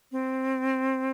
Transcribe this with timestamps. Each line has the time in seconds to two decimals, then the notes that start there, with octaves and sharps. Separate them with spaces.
0.12 C4